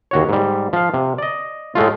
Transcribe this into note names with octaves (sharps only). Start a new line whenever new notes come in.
D#2 F#4 C#5
G#2 G3
F3 F5
C3
D5 D#5
A2 G#3 A3 F4